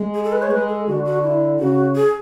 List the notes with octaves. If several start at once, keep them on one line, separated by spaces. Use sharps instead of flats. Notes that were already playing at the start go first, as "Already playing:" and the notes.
Already playing: G#3
G#4
A4
B4
C#5
G#3 B4
A4
D3 F#4
F#4
E4
C#3 F#4
G#4